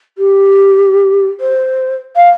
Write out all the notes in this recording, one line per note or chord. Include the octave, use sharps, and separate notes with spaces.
G4
C5
F5